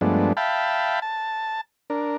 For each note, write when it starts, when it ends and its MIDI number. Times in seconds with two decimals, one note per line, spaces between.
0.01 0.33 43
0.01 0.33 53
0.01 0.33 56
0.01 0.33 57
0.01 0.33 59
0.01 0.33 62
0.37 1.00 76
0.37 1.00 77
0.37 1.00 79
0.37 1.00 81
0.37 1.00 83
1.02 1.61 81
1.90 2.17 62
1.90 2.17 70